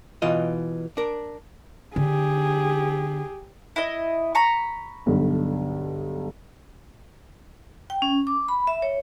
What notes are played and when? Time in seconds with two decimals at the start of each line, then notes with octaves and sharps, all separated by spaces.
0.22 B2 E3 F4 D#5
0.97 D4 A#4
1.96 D3 G4 G#4
3.76 E4 D#5
4.35 A#5 B5 C#6
5.06 B1 G2 D3
7.90 G5
8.02 C#4
8.27 D6
8.48 B5
8.67 E5
8.82 C#5